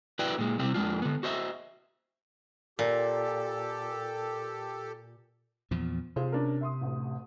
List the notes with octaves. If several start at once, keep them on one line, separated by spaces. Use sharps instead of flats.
E4 F#4 B4 D5 E5 G5
A#2 G#3
C3 G3 C4 E4
F2 G#3 D4 F4
D3 B3
F#4 C5 D#5 E5
A#2 G4 A4
E2 A#2 F3
C3 F4 G#4 C5
C#4 D4 A#4
E5 C6 D#6
A1 D2